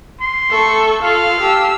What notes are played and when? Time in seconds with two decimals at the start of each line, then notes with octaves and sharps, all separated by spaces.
0.20 C6
0.51 A3 A4 C#6
1.03 F4 A4 F5
1.41 G4 A5 E6